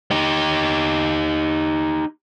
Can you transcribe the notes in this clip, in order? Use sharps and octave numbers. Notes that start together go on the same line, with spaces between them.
D#4 G4